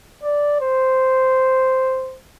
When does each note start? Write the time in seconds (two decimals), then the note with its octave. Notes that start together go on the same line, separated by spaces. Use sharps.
0.23 D5
0.61 C5